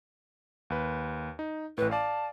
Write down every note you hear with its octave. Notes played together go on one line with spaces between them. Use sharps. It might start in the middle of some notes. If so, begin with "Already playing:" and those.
D#2 B4
D#4
A1 A2 B4
D5 F5 A5